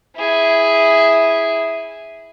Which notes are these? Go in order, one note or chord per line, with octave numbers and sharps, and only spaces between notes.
E4 G#4